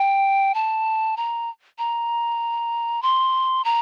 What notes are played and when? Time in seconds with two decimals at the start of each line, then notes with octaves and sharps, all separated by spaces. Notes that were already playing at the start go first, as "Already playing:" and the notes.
Already playing: G5
0.54 A5
1.17 A#5
1.79 A#5
3.02 C6
3.64 A#5